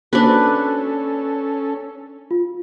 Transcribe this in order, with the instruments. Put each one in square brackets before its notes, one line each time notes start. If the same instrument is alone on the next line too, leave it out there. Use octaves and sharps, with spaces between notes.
[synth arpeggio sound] A#3 F#4 C5 [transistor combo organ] C#4 A4 [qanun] D4 B4
[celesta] F4